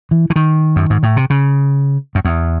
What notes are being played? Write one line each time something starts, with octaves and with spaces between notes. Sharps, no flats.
E3
E3
D#3
F#2
G#2
A2
C3
C#3
F#2
E2